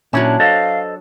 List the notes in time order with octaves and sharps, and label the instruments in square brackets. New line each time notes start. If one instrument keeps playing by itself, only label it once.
[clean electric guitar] A#2 C#4 E4 [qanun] F#3 D4 A5
[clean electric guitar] A4 C5 D#5 [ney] F5